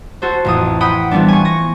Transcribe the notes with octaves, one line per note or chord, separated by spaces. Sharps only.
F#4 A4 C5
A1 F2 D#6
F#5 G5 B5 D#6
E3 F3 G3 B3 D4
G#5 C#6
C#6 A#6